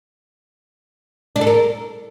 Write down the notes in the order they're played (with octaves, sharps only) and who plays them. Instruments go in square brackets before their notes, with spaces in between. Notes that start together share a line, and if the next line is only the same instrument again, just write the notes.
[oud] D4
A4
A#4